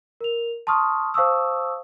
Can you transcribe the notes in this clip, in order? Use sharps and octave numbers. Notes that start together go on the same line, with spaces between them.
A#4 F7
A5 C6 C#6 D#6 F6
C5 F5 A5 C#6 D#6 E6